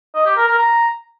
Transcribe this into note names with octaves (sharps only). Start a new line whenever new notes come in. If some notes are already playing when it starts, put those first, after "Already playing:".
D#5
G4
A#4
A#4
A#5